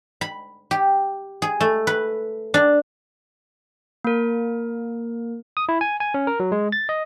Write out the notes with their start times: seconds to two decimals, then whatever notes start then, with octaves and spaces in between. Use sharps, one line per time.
0.21 B5
0.71 G4
1.42 G#4
1.60 A3
1.87 B4
2.54 D4
4.04 A#3 A#4
5.57 D#6
5.69 E4
5.81 G#5
6.00 G#5
6.14 C#4
6.27 A#4
6.40 F#3
6.52 G#3
6.72 A6
6.89 D#5